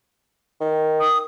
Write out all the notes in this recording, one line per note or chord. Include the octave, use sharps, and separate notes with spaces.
D#3
D#6